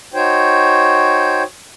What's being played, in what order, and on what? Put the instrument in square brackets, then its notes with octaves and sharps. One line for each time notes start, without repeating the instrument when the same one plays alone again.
[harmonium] D#4 F#4 C5 C#5 G5